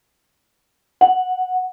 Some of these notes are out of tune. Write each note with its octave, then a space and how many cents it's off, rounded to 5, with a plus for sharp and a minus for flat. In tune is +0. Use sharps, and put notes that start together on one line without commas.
F#5 +0